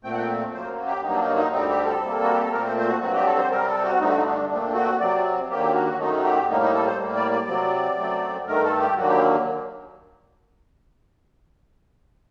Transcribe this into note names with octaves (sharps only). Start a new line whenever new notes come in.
A#2 A3 C4 G5
F#5
G5
F#2 F#3 A#3 C5
G4
G2 F#3 A#3 D#4
D4
D#4
D#4
D2 D3 G3 C4 D#4
G4
A4
C3 G3 A#3
F#4
G4
A4
A#2 A3 C4 A#4
C5
C5
F#4
G2 F#3 C4 F#4
G4
A4
C5
C3 G3 C4 A#4
A4
F#4
G2 D3 A3 D#4
F#4
D#4
D4
A#2 A3 C4 D4
F#4
C3 F#3 C4 D5
D#2 D3 F#3 A#3 G4
F#4
F#2 D#3 F#3 A3 D#4
G4
A2 G3 A#3 D#4
D#4
A4
C5
A2 G3 A#3
D5
D5
C3 F#3 C4
F#2 F#3 A3 C4
G2 D#3 A3 A#4
A4
G4
D#2 D3 F#3 A#3 F#4
G4